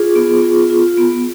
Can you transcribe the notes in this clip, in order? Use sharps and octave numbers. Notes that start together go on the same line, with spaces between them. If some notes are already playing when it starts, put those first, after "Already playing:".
Already playing: F4 G#4
B3
F4
F4
B3